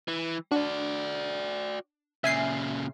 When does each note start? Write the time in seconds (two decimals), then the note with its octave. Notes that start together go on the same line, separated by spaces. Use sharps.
0.08 E3
0.52 D4 F#4 D5
2.24 A#2 C#3 E5 G#5 C7